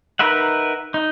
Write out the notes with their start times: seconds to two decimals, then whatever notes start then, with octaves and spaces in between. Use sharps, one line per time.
0.19 D#4 A#4 B4 E5 F#5
0.94 D#4